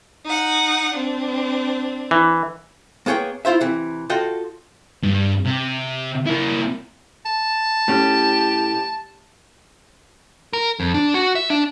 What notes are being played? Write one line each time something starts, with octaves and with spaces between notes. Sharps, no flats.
D#4 F#5
C4 D4
E3
A#3 B3 G#4 C#5 G5
E4 F4 C5 E5
C3 E3
F4 F#4 A4 D#5 G5
G2
C3
A#3 E4
A5
A2 C#4 G4
A#4
F2
D4
F#4
E5
D4